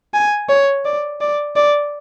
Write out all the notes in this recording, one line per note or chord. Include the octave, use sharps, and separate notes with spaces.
G#5
C#5
D5
D5
D5